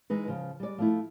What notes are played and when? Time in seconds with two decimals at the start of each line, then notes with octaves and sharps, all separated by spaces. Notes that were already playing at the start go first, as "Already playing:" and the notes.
0.10 E3 G#3 D#4 B4
0.28 C#3 F3
0.60 G3 G#3 D5
0.78 F3 A3 E4